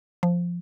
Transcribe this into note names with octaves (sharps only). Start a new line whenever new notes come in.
F3